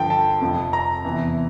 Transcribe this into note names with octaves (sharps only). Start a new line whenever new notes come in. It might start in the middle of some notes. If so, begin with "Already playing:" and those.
Already playing: G2 D3 F3 G5 A5
A5
F2 C3 F3
A#5
E2 C3 E3